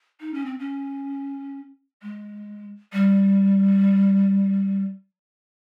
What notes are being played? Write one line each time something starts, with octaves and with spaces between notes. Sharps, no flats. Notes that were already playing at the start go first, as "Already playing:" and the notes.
D#4
C#4
C4
C#4
G#3
G3